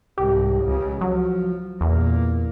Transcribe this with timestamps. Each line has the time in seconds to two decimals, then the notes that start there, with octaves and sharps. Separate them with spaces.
0.18 C2 G#2 G4
0.65 C#2 C#3
1.01 F3 F#3
1.81 E2 A#2 A#3